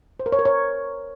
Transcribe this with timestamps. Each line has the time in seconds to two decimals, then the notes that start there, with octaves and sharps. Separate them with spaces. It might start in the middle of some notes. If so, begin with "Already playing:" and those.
0.20 C5
0.26 A#4
0.32 C#5
0.39 A#4
0.45 C#5